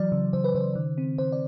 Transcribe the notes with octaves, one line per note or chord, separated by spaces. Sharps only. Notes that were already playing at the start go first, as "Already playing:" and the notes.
Already playing: E3 F#3 D5
C#3
C#3 C5
B4
C#3 C5
D#3
C4
D#3 C5
D5